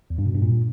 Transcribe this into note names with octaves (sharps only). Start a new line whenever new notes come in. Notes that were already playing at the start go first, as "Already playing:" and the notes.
E2
G2
B2
G2
A#2